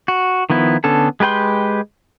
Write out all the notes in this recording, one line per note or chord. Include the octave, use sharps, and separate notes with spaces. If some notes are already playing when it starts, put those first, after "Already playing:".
F#4
D#3 F3 B3 E4
D3 B3 C#4 A4
G#3 G4 B4 G5 C6